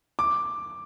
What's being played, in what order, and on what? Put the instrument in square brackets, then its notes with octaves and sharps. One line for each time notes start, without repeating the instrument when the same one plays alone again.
[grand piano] D6